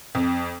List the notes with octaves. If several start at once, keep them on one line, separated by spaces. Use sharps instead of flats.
F2